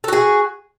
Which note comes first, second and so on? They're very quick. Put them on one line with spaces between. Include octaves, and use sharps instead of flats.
A4 F#4 G#4